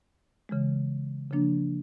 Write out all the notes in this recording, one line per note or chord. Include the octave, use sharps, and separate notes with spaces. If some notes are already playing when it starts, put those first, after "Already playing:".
C#3 E3 G#3
C#3 F3 A#3 D4